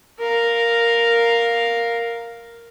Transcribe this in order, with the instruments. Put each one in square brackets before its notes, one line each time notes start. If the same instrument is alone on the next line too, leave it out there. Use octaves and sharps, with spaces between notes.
[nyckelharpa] A#4 F5